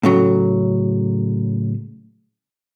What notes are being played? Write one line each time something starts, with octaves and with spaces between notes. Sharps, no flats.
A2 C#3 F#3